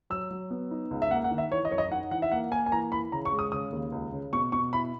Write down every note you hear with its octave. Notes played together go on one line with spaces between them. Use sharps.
F#3 E6
F#3
B3
D#4
C#2
E5
A#3 F#5
F#5
D#3
E5
E3 C#5
D#5
F#2 C#5
D#5
D#4 F#5
E3 F#5
E5
A#3 F#5
A#3 G#5
G#5
E3 A#5
E3 B5
C#3 A#5
C#6
G#3
D#6
C#3 D#6
D#2
C#2
C#3
B2 C#6
B2 C#6
E4 B5